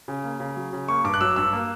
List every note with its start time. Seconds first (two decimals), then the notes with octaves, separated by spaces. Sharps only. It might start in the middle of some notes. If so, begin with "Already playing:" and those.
0.08 C#3
0.24 A#3
0.40 C#3
0.56 F#3
0.73 C#3
0.89 A#3 C#6
1.04 G2 D6
1.14 F#6
1.21 F#3 E6
1.36 G2 E6
1.53 A#3